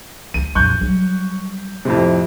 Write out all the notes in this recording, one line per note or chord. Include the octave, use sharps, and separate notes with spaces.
D2 D#7
A#1 F2 C#6 F#6 G6
F#3 G3
F2 A2 C3